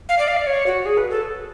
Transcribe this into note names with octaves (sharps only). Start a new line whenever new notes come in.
F5
D5
F5
D5
C#5
F#4
G#4
B4
A4